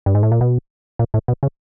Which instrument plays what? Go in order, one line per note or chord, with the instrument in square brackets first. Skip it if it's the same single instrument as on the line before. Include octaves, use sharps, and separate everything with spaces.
[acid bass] G2
G#2
A2
A#2
B2
A#2
A2
B2
C#3